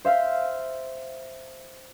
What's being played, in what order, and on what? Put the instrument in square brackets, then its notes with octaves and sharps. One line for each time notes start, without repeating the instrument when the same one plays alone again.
[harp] C5 E5 F5